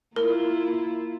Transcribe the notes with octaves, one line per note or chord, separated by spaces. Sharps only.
A#3 E4 F4 A#4